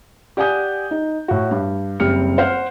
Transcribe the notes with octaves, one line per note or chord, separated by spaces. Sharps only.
G4 D5 F#5 G#5 D#6 G6
D#4
A2 F#4
G2
F#1 G3 C4 F6 C#7
C5 F#5 F6